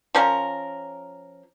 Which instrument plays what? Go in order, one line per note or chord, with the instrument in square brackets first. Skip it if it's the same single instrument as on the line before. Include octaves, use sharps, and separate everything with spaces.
[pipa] F3 C#4 A#4